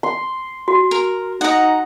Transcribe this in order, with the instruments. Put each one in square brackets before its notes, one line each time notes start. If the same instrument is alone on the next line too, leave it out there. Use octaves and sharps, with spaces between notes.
[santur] C6
[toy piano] F#4
[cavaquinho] A#4
[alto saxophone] D#4 [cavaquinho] F#5 A#5